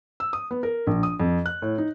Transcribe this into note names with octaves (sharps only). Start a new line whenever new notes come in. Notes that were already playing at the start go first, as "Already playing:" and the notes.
E6
D#6
B3
A#4
A#1
D#6
F2
F#6
A2
D#4